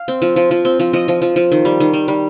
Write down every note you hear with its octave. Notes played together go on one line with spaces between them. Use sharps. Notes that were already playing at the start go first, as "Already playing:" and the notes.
Already playing: F5
C4
F3
F3
F3
C4
F3
F3 D#5
F3
F3
F3
D#3
G3
D#3
G3
G3